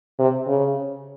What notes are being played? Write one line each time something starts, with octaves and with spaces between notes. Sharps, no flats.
C3
C#3